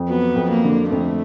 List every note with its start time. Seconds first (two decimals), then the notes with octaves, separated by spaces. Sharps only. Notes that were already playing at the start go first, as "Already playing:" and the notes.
Already playing: F2
0.09 F#3 B3
0.36 F2
0.50 A#3
0.64 D3
0.91 F2 A3